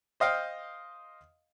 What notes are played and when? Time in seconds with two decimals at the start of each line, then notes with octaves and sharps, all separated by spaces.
0.20 C5 D#5 F5 G5